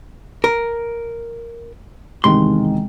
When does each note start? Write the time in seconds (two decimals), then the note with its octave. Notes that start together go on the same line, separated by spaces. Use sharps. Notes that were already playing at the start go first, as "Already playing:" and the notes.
0.44 A#4
2.24 E1 C3 D#3 C6